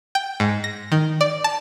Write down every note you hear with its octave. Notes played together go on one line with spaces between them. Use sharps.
G5
G#2
A#6
D#3
D5
A5